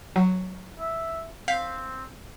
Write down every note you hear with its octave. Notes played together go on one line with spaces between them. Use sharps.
F#3
E5
C4 F5 G6 B6